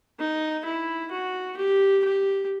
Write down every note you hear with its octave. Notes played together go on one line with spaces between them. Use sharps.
D#4
E4
F#4
G4
G4